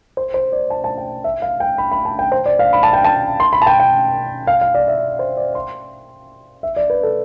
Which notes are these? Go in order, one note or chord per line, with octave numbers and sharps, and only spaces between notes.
C5
C5
D5
A5
A5
G5
E5
F5
G5
B5
B5
A5
G5
C5
D5
F5
B5
A5
G5
A5
C6
B5
A5
G5
G5
F5
F5
D5
E5
C5
D5
C6
E5
D5
B4
A4